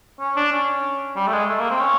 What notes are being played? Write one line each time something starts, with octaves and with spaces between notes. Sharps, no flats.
C#4
D4
C#4
G3
A3
G#3
A3
A#3
C4
C#4